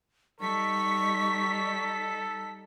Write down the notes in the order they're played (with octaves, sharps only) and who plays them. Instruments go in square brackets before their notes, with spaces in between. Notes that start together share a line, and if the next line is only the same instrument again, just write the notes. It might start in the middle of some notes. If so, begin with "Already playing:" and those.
[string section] G3 D#4 B6 [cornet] A4 [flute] C#6